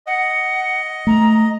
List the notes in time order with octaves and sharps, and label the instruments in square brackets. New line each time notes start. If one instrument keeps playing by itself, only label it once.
[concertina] D#5 [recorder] F#5
[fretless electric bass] A3 [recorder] A#5